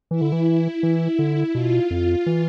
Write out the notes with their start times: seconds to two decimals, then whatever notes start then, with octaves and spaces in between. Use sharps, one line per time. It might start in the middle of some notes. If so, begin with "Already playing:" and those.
0.11 E3 E4
0.21 D3
0.32 E3
0.83 E3
1.19 D3
1.54 B2 F4
1.90 F2
2.26 E3